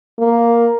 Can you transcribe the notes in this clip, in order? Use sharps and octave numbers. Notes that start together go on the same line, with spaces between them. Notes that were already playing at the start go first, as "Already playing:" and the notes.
A#3